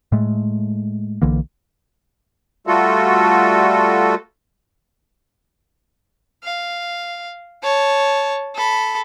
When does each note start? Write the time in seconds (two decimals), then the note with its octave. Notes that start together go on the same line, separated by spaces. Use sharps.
0.12 A2 G#3 A3
1.22 B1 D3 E3 A#3
2.67 G3 A3 F4 F#4 A4
6.44 F5
7.63 C#5 A5
8.55 A4 B5